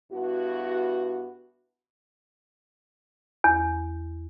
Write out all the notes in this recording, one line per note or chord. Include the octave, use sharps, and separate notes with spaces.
G2 B3 E4 F#4
E2